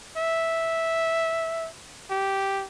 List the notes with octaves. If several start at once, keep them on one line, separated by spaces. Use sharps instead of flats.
E5
G4